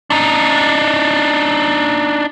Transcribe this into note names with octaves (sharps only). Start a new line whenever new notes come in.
D4 D#4